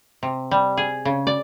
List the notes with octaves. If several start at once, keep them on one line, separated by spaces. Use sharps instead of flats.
C3
G3
G#4
C#3
D5